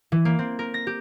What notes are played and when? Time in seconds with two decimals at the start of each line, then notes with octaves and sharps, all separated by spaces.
0.12 E3
0.25 A#3
0.39 C4
0.59 A#4
0.74 A#6
0.87 G4